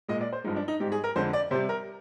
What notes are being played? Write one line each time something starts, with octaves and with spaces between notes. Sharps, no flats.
A#2 G#3 D#5
D5
C5
G2 F3 G#3 D#4
D4
D#4
G#2 G3 G4
G#4
A#4
F2 D3 G#3 C5
D5
C3 G3 C5
A#4